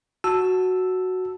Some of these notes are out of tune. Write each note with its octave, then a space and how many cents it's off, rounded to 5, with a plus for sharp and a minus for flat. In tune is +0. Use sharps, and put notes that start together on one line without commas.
F#4 +0 A5 +0 E6 +0